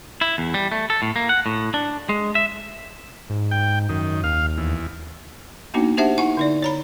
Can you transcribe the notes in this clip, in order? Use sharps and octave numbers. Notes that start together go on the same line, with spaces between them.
E4
E2
G3
A3
A4
A2
A#3
F#5
A2
D4
G#3
E5
G#2
G5
F#2 D#3
D#2 F5
E2
A#3 B3 D4 D#4 F#4
D4 G4 C5 E5 F#5 A5
D#4 E4 F#5 G#5 C#6
D3 D#4 D5
C#5 A#5 B5